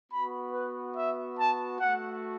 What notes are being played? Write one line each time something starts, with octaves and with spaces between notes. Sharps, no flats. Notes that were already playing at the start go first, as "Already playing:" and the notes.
B3 F#4 B5
B4
E5
A5
A3 F#4 F#5